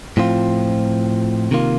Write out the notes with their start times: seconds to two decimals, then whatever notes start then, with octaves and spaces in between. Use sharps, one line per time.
0.17 A2 F3 C4 F4
1.51 C3 D#3 A#3 F4